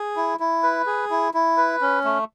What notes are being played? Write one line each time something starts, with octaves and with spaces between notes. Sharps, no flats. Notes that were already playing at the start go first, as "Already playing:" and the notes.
Already playing: G#4
E4
E4
B4
G#4
E4
E4
B4
C#4
A3